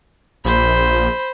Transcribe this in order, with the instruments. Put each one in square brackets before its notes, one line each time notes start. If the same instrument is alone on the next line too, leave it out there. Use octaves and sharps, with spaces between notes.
[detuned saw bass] A#1 [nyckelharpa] C5 B5